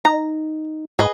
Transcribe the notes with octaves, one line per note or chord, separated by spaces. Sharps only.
D#4 A#5
G#2 G#4 B4 D#5